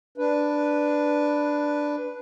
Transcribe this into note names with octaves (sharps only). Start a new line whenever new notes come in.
D4 B4